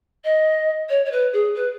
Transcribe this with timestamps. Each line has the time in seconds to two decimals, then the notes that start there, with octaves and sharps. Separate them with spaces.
0.24 D#5
0.89 C#5
1.05 C#5
1.11 B4
1.32 G#4
1.54 B4